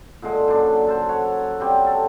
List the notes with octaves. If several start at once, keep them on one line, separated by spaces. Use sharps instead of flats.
A#2 D3 G#3
F#2 D4
A4 C5
C#5 F#5
F#3 G3 C4 G4
A4